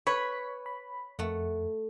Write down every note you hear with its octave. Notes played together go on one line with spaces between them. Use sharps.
B4 C#5 B6
B5
F2 A3 F#5